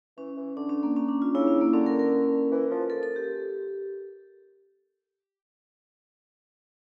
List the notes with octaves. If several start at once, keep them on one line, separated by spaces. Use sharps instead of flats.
E3 C#4
E3
D3 D4
C#4
A#3
C#4
D4
F4
C#3 E4
C#4
A#3
D3 C#4
A#4
A#4
E3
F3
A4
A4
G4